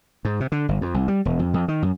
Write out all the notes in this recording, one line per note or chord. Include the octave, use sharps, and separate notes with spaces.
G#2
C3
D3
G1
F2
C2
G3
E1
F2
F2
D#3
F#2